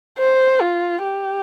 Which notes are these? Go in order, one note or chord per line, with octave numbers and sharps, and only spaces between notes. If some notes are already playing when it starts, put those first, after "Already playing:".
C5
F4
G4